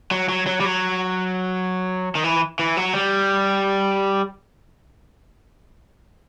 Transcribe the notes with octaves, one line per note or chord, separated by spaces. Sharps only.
F#3
F#3
F#3
G3
F#3
D#3
E3
E3
F#3
G3